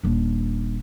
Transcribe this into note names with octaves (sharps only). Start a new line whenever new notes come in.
D#1 D4